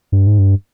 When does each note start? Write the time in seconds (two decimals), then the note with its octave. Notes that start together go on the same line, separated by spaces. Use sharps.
0.12 G2
0.27 G#2
0.38 G2